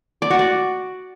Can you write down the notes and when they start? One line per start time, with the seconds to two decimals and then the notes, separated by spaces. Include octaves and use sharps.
0.22 D5
0.30 F#4
0.39 D5